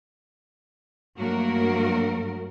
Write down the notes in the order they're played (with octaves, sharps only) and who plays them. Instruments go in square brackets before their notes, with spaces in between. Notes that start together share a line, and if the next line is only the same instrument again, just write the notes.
[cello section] G2 F#3 A3 A#3 F#4 A#4